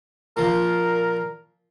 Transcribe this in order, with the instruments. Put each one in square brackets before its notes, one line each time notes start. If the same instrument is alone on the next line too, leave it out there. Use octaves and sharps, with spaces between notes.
[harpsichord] A#2 F3 [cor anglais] A#4